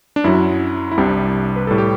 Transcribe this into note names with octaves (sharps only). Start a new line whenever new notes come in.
D4
F#2 F#3 E4
E4
C2 C3 G3 D4
B4
A2 G3 A4
G4